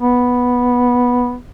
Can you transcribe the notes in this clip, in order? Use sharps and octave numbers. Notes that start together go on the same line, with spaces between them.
B3